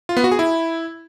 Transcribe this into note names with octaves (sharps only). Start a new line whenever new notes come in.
F4
B3
F#4
G#4
E4